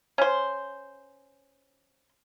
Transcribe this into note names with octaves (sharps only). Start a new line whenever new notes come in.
C#4 C5